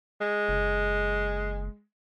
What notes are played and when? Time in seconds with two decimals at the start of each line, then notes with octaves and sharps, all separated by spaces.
0.21 G#3
0.49 F#1